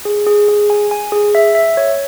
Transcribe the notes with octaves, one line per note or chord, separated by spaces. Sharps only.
G#4
G#4
G#4
G#5
G#5
G#4
E5
E5
C#5